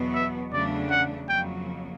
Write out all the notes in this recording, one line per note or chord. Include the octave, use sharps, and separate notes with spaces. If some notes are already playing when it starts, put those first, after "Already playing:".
Already playing: E2 B2 F#3 B3
E5
E2 C#3 F#3 A3 D4 D5
F#5
F2 C#3 F#3 A#3 G5